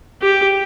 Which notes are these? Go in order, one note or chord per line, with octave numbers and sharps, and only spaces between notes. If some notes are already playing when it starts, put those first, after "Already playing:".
G4